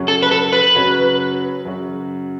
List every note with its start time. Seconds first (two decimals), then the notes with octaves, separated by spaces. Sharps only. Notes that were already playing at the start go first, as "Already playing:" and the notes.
Already playing: F#2 C#3 F#3 C#4 F#4
0.08 A4
0.23 B4
0.31 A4
0.53 B4
0.75 F#2 C#3 F#3 C#4 F#4
1.65 F#2 C#3 F#3 C#4 F#4